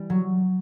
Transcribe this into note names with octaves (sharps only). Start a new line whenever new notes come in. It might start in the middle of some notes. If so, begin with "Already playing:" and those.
Already playing: E3 G3
F#3